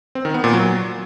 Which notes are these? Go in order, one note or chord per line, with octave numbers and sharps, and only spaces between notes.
C4
D#3
B3
A#2
F#3